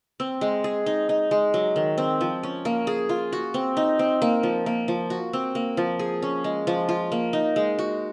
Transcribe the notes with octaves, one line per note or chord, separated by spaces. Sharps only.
C4
G#3
G#4
D#4
D#4
G#3
F#3
D#3
C4
F3
C#4
A#3
G#4
F4
F#4
C4
D#4
C4
A#3
F3
A#3
F3
F#4
C4
A#3
F3
G#4
C#4
G#3
F3
F4
A#3
D#4
G#3
F#4